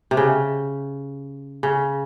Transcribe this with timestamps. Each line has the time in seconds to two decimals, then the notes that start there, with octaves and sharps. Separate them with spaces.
0.11 C3
0.17 C#3
1.63 C#3